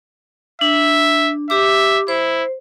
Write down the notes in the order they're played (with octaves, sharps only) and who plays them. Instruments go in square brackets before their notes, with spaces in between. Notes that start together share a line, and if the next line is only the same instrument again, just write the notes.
[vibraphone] D4 [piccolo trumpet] E5
[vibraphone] G4 D6 [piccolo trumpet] E5
[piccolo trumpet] E4 [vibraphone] C5